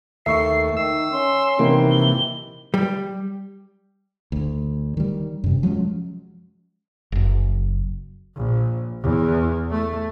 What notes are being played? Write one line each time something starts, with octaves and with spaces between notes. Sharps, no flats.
D#2 A3 E5 C#6 C7
D#3 E6 C7
C#4 C6
C3 D#3 E3 A#3
G7
G3
D2
D#3 G3
F#2 C3
F3 F#3 G#3 C#4
F#1 F#2
A#1
E2
A3